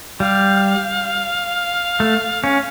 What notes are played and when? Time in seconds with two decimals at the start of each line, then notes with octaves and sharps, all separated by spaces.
0.20 G3 F5
2.00 A3
2.44 C#4